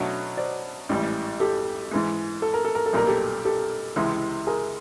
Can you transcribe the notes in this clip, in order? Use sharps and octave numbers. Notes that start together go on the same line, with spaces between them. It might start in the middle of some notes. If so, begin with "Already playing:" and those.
Already playing: B2 F#3 A3 D4 F#4
C5 D5
A1 G#2 E3 G3
G4 A4
G#2 E3 G#3
A4
A#4
A4
A#4
A4
B1 A#2 G3 A#4
G4 A4
G4 A4
C#2 C3 E3 G#3
G#4 A#4